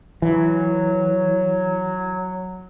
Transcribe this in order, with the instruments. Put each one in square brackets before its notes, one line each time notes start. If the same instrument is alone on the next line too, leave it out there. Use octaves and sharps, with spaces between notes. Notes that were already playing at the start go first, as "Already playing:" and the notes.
[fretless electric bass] E3 [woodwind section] F#3